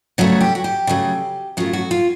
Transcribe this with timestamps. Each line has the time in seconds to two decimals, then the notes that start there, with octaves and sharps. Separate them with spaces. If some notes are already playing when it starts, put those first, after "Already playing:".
0.18 C#3 F#3 A3 F#4
0.41 G4
0.55 F#4
0.64 G4
0.87 C#3 F#3 A3
1.57 C#3 F#3 A3 F4
1.73 F#4
1.91 F4